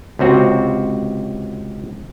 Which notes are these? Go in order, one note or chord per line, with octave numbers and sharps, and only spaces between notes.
C#2 C3 C4 F#4